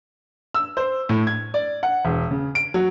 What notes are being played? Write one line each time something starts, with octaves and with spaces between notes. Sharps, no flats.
E6
C5
A2
G#6
D5
F#5
E1
C#3
D7
F#3